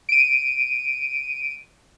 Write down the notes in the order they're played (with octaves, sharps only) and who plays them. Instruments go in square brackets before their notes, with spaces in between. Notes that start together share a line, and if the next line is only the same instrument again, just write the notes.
[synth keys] D7 D#7